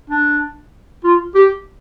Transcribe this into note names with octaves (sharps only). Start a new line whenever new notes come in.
D4
F4
G4